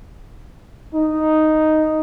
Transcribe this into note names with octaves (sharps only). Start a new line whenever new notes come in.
D#4